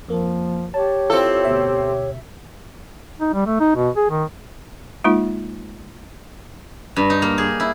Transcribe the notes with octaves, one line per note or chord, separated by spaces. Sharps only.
F2 F3 A#3
G4 C#5 A5
C4 E4 F4 A4
D2 B2 E5
D#4
G3
A3
D#4
B2
G#4
D#3
G#3 A#3 D#4 F4
G2
D#4
A#3
G#4
E4